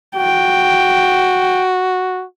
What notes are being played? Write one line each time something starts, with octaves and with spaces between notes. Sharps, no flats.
F#4 G5